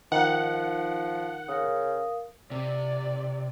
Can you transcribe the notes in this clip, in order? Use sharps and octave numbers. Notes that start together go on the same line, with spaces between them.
D#3 F3 F#5
C#3 A#4 F5 D#6
C3 D5